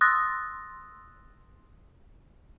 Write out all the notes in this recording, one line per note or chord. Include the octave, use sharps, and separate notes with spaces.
C6 D#6 E6 F#6 A6 A#6